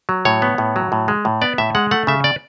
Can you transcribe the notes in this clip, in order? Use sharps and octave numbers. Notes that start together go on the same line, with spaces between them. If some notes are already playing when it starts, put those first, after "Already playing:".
F#3
A2 C#5
B3
A2
F#3
A2
G#3
A2
B3 D5
A2 E5
G#3 F#5
A3 F#5
C#3 E5
D5